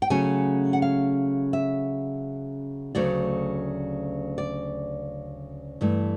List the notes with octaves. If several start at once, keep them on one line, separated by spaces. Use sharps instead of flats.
G5
C#3 F#3 A3 C#4 G#5
F#5
F5
E5
D2 C#3 F#3 A3 D5
D5
G2 E3 A3